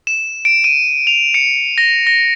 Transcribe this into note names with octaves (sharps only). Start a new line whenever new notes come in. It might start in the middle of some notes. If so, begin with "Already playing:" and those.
E7
D7
D#7
F7
C#7
A#6
A#6